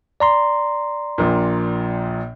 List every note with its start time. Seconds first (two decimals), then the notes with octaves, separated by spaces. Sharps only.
0.20 D5 A#5 C6
1.18 A#1 A#2